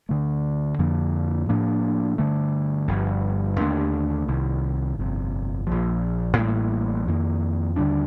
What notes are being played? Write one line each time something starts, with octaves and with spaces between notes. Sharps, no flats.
D2 D3 A3
F2 D3 F3 A#3
A2 F3 A#3 D4
G2 D3 A3
G1 G2 F3
D#2 D3 A3 D4
C2 C3 D#3
G1 F2 C3
A#1 A#2 F3
A1 A2 G3 A#3
F2 D#3 A#3
D#2 D3 G3 D4